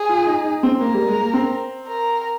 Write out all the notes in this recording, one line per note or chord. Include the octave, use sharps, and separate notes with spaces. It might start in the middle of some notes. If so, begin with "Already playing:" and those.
Already playing: G#4
F4
D#4
D#4
C4
A#3 A#4
G3
G#3
A#3
C4
A#4